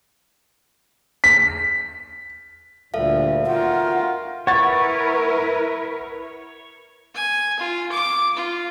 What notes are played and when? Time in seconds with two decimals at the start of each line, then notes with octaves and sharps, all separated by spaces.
1.24 B6
2.94 D2 A#2 G3 A4 E5 F5
3.47 F4 F#4 A#4 F#5 G5
4.47 E4 A#4 B4 C#5 F#5 A6
7.15 G#5
7.59 F4
7.91 D6
8.37 F4